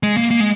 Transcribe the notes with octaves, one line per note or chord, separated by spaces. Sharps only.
G#3
A#3
A#3
G#3